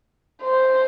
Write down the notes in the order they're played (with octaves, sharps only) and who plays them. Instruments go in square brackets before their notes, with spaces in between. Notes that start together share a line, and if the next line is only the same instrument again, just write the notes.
[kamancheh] C5